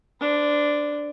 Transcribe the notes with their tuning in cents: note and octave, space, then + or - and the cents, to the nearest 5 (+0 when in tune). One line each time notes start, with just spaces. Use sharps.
D4 +0 C5 -35